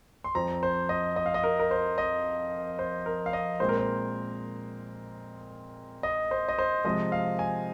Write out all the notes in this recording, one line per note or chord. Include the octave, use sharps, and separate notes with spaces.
C6
F2 F3 C4 A#5
C5
D#5
D#5
F5
D#5
A#4
A#4
C5
D#5
C5
A#4
F5
D#5
A#2 G#3 C4 C5
A#4
C5
D#5
C5
D#5
C5
C3 F3 G#3 C4 D#5
F5
G#5